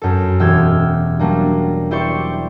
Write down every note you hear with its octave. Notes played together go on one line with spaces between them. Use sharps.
F#2 A4
E1 G4 E6 F6 G#6
F#3 G3 A#3 D4
E4 G4 C5 D5 C#6